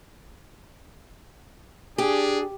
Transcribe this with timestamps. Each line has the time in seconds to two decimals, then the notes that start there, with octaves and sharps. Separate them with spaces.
1.98 D4 G4 G#4